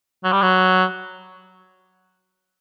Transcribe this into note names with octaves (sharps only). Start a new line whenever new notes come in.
F#3
G3
F#3